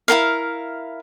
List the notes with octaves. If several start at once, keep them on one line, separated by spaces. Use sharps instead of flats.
E4 G4 A#4 F5